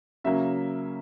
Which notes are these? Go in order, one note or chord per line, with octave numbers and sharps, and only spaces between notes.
C#3 F#3 A#3 C#4 E5